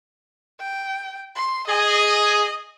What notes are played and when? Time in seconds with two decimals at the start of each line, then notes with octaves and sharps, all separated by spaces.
0.60 G5
1.36 C6
1.67 G#4 D#5